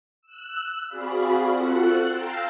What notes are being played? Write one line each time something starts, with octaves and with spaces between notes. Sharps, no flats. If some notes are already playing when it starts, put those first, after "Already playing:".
E6 F#6
C4 F#4 G#4 D5 F5 B5
C4 F4 F#4 A4 F#5 F#6
F5 G5 A5 A#5 C6 E6